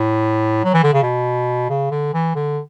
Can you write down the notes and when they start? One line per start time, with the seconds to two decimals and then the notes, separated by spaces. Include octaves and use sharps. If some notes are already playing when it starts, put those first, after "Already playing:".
Already playing: A2
0.64 F#3
0.74 E3
0.84 D3
0.93 C#3
1.03 B2
1.70 C#3
1.91 D3
2.14 E3
2.36 D3